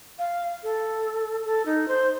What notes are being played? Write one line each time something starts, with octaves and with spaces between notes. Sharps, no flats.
F5
A4
A4
D#4
C5